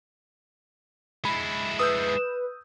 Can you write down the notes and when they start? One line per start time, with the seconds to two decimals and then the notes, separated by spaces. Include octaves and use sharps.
1.25 G#3 E4 B5
1.79 B4 D#6 E6 G6